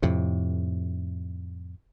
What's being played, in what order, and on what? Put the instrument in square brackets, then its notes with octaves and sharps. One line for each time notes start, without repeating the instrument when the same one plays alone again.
[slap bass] F2 A2 C3